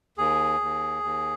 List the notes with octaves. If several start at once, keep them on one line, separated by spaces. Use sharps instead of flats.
D#2 G#4
D#2
D#2